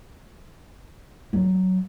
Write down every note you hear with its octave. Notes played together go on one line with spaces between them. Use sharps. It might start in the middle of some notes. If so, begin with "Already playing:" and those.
F#3